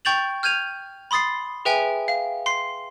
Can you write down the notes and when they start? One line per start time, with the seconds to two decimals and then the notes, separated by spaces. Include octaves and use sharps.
0.05 G5 C#6 G6 A6 F7 F#7
0.43 F6 G6 G#6 D#7 F7
1.11 B5 C6 D#6 A6 C7
1.65 G#4 B4 E5 G5 G#5
2.08 F5
2.46 C6 C7